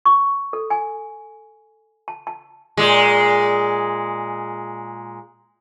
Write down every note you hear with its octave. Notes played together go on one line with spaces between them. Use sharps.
C#6
A4
G#5
A5
A5
A#2 G#3